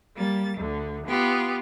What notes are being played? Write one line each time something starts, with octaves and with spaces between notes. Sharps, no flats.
G3 A#3 A6
D2 D3
B3 F4 G4